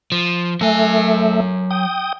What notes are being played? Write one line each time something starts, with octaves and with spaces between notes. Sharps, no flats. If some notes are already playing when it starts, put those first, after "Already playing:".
F3
F#3 A3 E5 G#5
G5 D#6